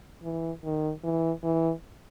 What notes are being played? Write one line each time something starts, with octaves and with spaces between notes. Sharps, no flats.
E3
D#3
E3
E3